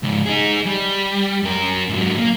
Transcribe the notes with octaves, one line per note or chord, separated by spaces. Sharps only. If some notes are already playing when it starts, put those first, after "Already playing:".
C#2 G#2
D#4 G#4
G3
F#2 A#4
G#2 F#3
A#3